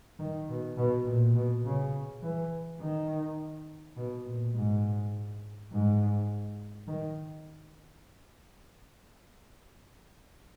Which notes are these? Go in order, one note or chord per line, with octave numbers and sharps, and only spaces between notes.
D#3
B2
B2
A#2
B2
C#3
E3
D#3
B2
A#2
G#2
G#2
D#3